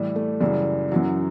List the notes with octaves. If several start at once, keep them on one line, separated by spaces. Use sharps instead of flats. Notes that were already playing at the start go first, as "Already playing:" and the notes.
Already playing: A2 E3 G3
A3
F#2 C#3 E3 G3
F#2 E3 F#3